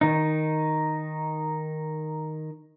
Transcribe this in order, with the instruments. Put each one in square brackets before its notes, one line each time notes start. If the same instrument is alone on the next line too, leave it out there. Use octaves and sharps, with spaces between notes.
[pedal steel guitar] D#3 D#4